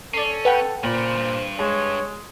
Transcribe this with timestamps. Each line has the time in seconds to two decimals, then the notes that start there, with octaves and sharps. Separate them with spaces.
0.14 C#4 A4 D5 C7
0.45 B4 F#5 G5
0.83 A#2 C#3 C5 B5
1.17 G2
1.59 G#3 C#5